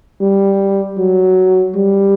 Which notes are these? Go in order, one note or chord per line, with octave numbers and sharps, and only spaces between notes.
G3
F#3
G3